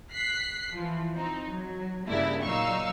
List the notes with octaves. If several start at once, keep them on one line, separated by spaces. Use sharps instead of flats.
F#6 B6 C7
E3 F3
C4 D#4
F#3
G2 C#3 A#3 D4 E4 G4
A#2 F#3 D#4 F5 C#6 E6